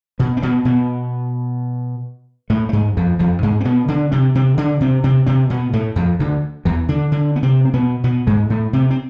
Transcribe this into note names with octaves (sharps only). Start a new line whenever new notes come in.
B2 B3
C4
B2 B3
B2 B3
A2 A3
A3
G#2 G#3
F2 F3
F2 F3
G#2 G#3
C4
B2 B3
D3 D4
C3 C4
C3 C4
D3 D4
C3 C4
C3 C4
C3 C4
B2 B3
A2 A3
F2 F3
D2 D3
E2 E3
D3 D4
D3 D4
B3
C3 C4
C4
B2 B3
B2 B3
G#2 G#3
A2 A3
C3 C4
C4